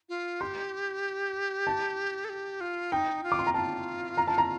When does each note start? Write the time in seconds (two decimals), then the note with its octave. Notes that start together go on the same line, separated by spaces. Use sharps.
0.09 F4
0.41 G4 C6
1.67 A5
2.25 A4
2.29 G4
2.61 F4
2.92 D#4 G5
3.23 F4
3.32 D6
3.39 C6
3.47 A#5
3.54 F4 A5
4.18 A#5
4.28 A5
4.38 A#5